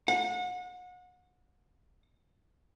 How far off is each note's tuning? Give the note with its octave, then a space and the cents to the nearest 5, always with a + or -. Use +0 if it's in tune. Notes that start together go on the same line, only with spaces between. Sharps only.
F#5 -35